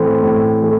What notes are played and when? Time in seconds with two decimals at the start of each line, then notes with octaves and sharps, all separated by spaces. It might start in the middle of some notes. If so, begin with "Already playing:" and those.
Already playing: A2 E3 A3 C4
0.23 A2
0.61 E3 A3